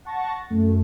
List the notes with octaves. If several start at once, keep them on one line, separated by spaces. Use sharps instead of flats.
F#5 A5 C#6 A6 A#6
F#2 A3